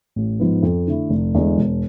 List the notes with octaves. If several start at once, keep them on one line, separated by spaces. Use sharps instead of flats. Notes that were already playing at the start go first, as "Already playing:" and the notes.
A1
G#2 F3 B3
F2
D3 A3 E4
F1
E2 D3 G#3
E1